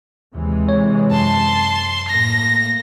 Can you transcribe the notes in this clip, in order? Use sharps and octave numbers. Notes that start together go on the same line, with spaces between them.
D#2 C3 E3 G#3
C#5
F#2 A5 C6
A2 A#3 A#6